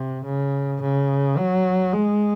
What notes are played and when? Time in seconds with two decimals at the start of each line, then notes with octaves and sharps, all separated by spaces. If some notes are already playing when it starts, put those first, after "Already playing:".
Already playing: C3
0.25 C#3
0.82 C#3
1.38 F#3
1.93 G#3